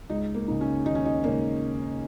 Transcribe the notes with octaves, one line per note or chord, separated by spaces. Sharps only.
C#2 D#4
A#3
C#3 G#3 D#4
C#4
D#2 D#4
C#4
D#4
C#3 G#3 A#3 D#4 C#5